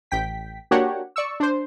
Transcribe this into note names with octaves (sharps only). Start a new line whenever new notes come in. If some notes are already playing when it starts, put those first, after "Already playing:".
A1 G5 B6
A#3 D4 F#4 G4 C#5 F#5
D5 C#6 E6
D4 C5